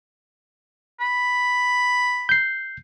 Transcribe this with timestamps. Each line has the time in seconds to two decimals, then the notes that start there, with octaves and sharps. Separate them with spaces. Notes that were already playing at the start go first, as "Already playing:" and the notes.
1.00 B5
2.29 G6 C7